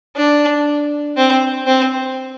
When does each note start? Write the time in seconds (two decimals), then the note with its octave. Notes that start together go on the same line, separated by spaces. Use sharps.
0.16 D4
1.17 C4
1.67 C4